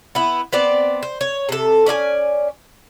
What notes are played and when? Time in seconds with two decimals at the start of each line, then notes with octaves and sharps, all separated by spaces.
0.15 B3 E4
0.52 B3 C4 D5
1.03 C5
1.21 C#5
1.49 C3 A4
1.86 C#4 D5 D#5 G#5